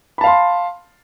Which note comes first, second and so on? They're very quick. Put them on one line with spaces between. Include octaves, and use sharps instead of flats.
B5 A5 F5 C6